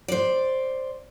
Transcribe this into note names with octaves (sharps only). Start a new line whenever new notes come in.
C5 D5